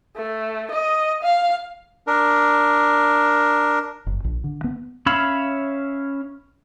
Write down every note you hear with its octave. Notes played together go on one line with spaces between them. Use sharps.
A3
D#5
F5
D4 A#4
F#1
A#1
D3
B3
C#4 C#5 E5 F5 B5